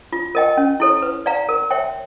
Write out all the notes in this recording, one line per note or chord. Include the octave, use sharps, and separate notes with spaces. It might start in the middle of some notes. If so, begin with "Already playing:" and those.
F4
A#4 D#5 G5
C#4
E4 A4 C#5
B4
D5 F5 A#5
A#4
C#5 E5 G5